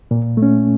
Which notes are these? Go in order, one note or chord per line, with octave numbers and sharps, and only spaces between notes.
A#2
A3
C#4